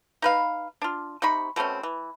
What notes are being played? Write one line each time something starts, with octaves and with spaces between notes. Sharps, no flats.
D#4 B4 F5
D4 F4
C3 D#4 B5 C#6
B2 A3 C4 C#4
E3